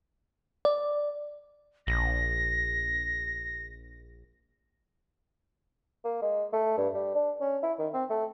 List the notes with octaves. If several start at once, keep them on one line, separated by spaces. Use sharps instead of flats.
D5
A#1 A#6
A#3
G#3
A3
G2
G3
D4
C#4
E4
D#3
C4
A3